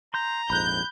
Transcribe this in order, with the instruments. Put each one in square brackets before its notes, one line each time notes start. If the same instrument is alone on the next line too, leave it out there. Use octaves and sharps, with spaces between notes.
[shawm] A#5 [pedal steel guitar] C6 G6
[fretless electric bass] A#1 F2 G#2 [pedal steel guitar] B5 F#6 [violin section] G6